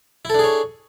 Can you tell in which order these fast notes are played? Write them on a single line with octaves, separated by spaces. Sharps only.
E4 A4 D4 G#4 C#5